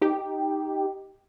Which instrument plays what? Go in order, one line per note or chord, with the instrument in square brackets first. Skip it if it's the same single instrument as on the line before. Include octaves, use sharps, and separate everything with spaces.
[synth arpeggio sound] D#4 G4